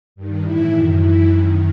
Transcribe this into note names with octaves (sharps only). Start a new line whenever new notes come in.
G2 D#3
A2 E3 E4
F#2 D#3
F#2 E3 E4
F#2 D#3